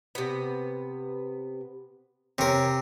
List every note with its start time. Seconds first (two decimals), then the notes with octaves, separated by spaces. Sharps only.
0.15 C3 B3
2.38 C3 C#4 A#4